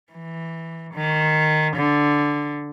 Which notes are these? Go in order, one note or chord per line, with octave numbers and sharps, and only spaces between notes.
E3
D#3
D3